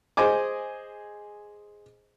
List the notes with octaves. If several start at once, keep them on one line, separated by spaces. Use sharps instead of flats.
G#4 C5 D#5 G#5 D6